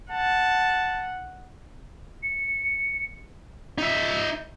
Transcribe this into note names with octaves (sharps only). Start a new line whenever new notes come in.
F#5 A5
C#7
D#4 E5